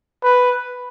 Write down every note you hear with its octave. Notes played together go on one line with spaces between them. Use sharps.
B4